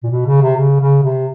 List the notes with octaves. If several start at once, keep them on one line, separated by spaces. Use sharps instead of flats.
A#2
B2
C#3
C3
C#3
C#3
C3